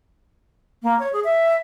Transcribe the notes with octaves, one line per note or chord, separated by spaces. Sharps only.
A#3
C#5
G#4
E5